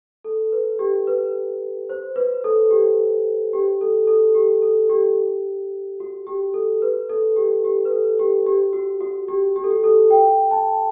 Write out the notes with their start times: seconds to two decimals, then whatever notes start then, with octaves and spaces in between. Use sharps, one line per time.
0.24 A4
0.52 B4
0.79 G4
1.07 B4
1.89 C5
2.16 B4
2.44 A4
2.71 G4
3.53 G4
3.81 A4
4.07 A4
4.35 G4
4.62 A4
4.90 G4
6.00 F#4
6.27 G4
6.54 A4
6.82 B4
7.09 A4
7.36 G4
7.64 G4
7.85 B4
7.91 A4
8.19 G4
8.46 G4
8.73 F#4
9.01 F#4
9.28 G4
9.56 G4
9.64 A4
9.70 G4
9.84 A4
10.10 G5
10.51 A5